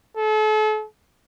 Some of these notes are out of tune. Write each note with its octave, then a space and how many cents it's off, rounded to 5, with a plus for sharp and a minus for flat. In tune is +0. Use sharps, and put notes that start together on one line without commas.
A4 -40